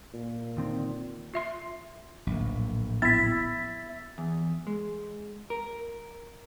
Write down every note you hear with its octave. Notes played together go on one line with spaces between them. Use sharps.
A#2
D3 D#3 C4
F4 E5 C6
D1 A#1
B3 E4 A6 B6
E2
G#3
A#4